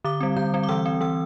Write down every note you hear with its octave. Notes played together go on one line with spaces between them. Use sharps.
D3 D6
G3 C4
D3 G6
G3 C4
D6
E3 E6
C4
E3 E6